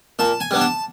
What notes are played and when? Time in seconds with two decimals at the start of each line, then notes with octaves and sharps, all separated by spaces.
0.19 A#2 A5
0.40 G#5
0.51 G3 B3 D4
0.61 A5